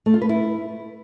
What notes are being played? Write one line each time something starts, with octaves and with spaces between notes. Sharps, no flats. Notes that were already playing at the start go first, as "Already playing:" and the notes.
A3
F4
B4
E4